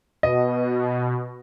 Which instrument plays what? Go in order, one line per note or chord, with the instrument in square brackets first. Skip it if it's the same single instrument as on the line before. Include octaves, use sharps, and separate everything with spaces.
[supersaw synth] B2 [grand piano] D#5